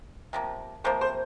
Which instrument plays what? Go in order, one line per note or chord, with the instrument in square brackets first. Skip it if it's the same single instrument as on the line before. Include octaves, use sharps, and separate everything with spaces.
[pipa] C3 F3 A#3
[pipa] C3 F3 A#3 [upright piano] C5
[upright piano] C5